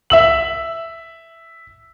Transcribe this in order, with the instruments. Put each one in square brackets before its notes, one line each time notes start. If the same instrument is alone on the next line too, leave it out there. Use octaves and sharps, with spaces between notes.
[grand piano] E5 E6 F#7